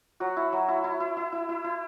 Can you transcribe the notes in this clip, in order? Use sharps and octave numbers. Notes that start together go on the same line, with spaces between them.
F#3 F#4
E4
F#3
E4
E4
E4
E4
E4
E4
E4